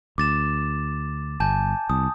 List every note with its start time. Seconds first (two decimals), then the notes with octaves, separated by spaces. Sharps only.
0.18 D2 D6 A6 E7
1.40 G1 G#5 A5 G6
1.90 C2 D#6